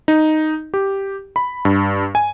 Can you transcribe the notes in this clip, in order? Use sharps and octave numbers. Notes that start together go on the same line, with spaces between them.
D#4
G4
B5
G2
G#5